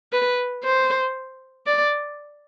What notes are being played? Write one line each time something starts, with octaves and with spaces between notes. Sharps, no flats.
B4
C5
D5